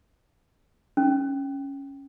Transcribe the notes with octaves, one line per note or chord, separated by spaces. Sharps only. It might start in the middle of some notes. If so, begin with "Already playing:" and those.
C#4